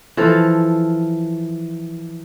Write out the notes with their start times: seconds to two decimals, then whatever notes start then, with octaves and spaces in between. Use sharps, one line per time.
0.17 E3 F3 A4